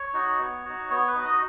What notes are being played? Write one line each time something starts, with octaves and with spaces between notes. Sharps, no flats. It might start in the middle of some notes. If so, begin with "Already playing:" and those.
Already playing: C#5
D#4 F#4
B3
D#4 F#4
B3 C#5
B4
D#4 F#4
D#5